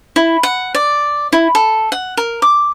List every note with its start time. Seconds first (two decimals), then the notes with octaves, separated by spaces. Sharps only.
0.16 E4
0.43 F#5
0.75 D5
1.33 E4
1.55 A4
1.92 F#5
2.17 A#4
2.42 D6